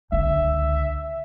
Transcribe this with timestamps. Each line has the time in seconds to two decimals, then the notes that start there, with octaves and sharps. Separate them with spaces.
0.12 C#2 D3 E5